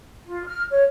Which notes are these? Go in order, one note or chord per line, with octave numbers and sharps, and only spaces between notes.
F4
F6
C#5